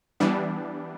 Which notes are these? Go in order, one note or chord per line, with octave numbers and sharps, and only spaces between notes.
E3 G3 B3 D4